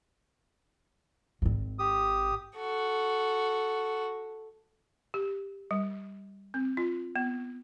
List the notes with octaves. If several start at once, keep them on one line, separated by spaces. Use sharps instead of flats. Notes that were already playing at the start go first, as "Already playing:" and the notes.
G#1 C4
G4 D#6
F#4 A4
G4
G3
C4
F4
B3